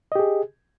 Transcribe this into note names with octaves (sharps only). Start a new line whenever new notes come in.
G4 G#4 D#5